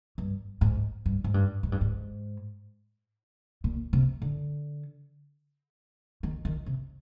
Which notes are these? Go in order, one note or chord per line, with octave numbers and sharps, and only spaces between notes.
G2
G#2
G2
G#2
G2
G#2
G2
G#2
A#2
C3
D3
D#3
D#3
C3